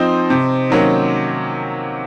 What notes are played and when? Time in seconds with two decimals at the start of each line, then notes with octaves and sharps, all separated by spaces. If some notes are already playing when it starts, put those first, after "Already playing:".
Already playing: F3 C4 D#4 C5 D#5
0.30 C3
0.70 D#3 F#3 A#3 C#4